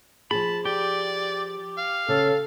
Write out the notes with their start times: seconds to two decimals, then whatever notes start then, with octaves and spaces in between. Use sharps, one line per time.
0.31 F3 G#4 A5 B5
0.65 G4 D5
1.77 F5
2.08 C#3 A4